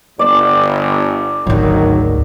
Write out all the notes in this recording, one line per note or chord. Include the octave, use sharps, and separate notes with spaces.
G1 D5 E6
G#1 D2 D#3 F#3